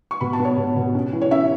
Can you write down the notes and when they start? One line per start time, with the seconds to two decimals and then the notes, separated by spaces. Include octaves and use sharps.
0.11 C#6
0.21 B2 B5
0.33 A5
0.39 B3
0.45 C#5
0.57 B2
0.76 B2
0.95 C#4
1.13 E3
1.21 C#5
1.31 C#4 E5